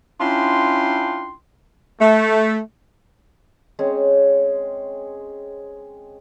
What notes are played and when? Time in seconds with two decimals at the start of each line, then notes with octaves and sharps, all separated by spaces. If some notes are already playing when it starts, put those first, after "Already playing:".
0.21 C#4 D4 E4 F4 G5 C6
2.01 A3
3.79 G#3 C4 C#4 G#4